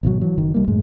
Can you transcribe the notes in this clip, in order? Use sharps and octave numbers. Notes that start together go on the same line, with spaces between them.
G#1 B2 D3 F#3
E3 F#3
F#1 D#3 F#3
C2 G3 A#3
F#2 A2 G#3